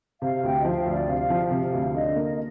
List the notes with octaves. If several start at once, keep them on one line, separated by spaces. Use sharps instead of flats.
C3 F5
D2 G5
D#5
F3 F5
D2 D5
C3 F5
F3
G5
C3 F5
D2
D3 D#5
A#3